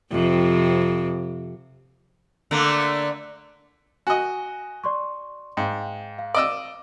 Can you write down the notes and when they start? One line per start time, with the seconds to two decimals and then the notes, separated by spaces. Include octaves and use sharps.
0.12 F2 C3
2.51 D3 A3 A#3
4.07 F#4 D#5 G#5
4.84 D5 C6 C#6
5.57 G#2 F5 G5
6.19 F5
6.34 D5 D#5 E6